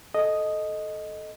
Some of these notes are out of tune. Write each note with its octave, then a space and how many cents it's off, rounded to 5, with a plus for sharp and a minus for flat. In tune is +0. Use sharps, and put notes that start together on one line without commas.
A4 -10 D#5 +0